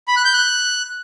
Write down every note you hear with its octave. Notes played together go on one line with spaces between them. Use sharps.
B5
F#6
G6
F#6